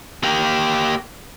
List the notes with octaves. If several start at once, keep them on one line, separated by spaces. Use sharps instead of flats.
A#3 G4